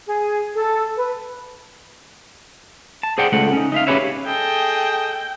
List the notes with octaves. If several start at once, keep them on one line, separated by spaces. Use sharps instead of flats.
G#4
A4
B4
A5
G#4 C5 D5 F#5 G5
C#2 A3 F#5
C#4 D#4
D#4 E5 F5
C#4 G4 G#4 B4 C#5 E5
G#4 A4 D#5 G5